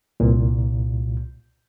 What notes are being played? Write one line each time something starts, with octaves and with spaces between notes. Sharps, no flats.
C2 A#2